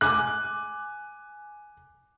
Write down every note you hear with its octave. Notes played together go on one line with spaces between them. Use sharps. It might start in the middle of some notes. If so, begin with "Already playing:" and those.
G#5 D6 F#6